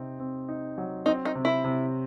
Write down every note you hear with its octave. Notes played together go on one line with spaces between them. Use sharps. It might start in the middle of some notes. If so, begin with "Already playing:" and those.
Already playing: C3 C4 D#4
C4
D#4
F#3
C4 D#4
D#4
C3
E4
C3